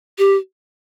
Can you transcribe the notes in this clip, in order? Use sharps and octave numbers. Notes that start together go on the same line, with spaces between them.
G4